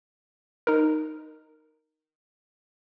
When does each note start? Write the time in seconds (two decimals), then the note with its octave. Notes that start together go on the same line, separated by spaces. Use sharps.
0.67 D#4 A#4